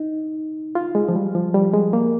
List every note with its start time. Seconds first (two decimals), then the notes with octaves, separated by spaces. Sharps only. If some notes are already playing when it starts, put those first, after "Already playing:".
Already playing: D#4
0.75 F4
0.95 G#3
1.08 F3
1.15 G3
1.35 F3
1.54 G3
1.73 G#3
1.93 A#3